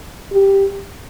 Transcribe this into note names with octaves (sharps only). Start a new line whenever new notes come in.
G4